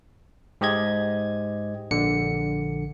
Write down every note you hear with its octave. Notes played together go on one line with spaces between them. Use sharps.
G#2 G4 D#5 G#6
A#1 D3 C#7